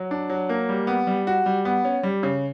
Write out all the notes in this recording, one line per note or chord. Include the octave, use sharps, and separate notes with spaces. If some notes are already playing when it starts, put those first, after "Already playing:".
Already playing: F#3
D4
F#3
A#3
G3
B3
G3
F#4
G3
B3
C#4
G3
C#3